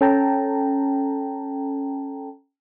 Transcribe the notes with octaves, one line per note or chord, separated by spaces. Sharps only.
C#4 A4 G5 A5 A#5